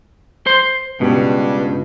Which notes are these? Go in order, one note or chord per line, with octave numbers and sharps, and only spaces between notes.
C5 C6
C#2 G2 B2